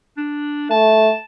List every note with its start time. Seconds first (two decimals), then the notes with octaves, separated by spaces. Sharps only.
0.17 D4
0.70 A3 A5